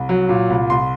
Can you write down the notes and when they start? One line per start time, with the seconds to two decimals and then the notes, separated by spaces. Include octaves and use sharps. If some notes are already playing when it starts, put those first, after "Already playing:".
Already playing: C2
0.09 F#3
0.29 A#2
0.50 C2
0.70 C2 C6